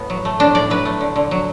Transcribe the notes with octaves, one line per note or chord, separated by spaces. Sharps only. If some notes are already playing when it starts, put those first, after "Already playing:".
Already playing: A2 B3
F#3
A3
A2 D4
A2 D5
F#3 B4
A3
D3
D3
F#3